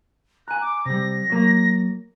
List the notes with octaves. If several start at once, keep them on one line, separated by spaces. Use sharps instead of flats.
G#5 A#5 F#6
D6
C3 G3 A#6
F#3 A#3